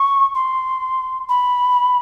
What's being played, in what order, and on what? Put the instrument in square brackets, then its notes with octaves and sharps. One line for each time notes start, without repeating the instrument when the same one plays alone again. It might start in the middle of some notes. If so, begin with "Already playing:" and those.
Already playing: [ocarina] C#6
C6
B5